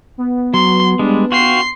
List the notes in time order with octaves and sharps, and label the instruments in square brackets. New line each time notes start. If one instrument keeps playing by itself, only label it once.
[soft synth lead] B3
[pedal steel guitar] F#3 [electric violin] C6
[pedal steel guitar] G3 G#3 [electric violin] D4
[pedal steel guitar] F#4 F5 G5 [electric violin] C6 C7